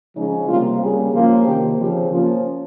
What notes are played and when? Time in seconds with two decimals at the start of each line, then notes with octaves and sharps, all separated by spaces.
0.16 C#3 F3 G#3 C#4 D#4
0.48 C3 G3 A#3 F4
0.81 C#3 G3 A#3 C#4 G#4
1.13 F3 A#3 C#4 F4
1.46 C3 D#3 A#3 G4
1.78 C#3 F3 C4 G4
2.11 F3 A#3 C#4 F4